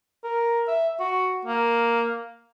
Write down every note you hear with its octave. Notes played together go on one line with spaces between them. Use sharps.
A#4
E5
F#4
A#3